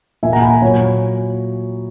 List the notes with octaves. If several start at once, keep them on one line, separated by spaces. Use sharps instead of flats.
A#2 A#3 E5 G#5
F#5 A#5
G#5 B5
A#2 F#3 A#3 C#5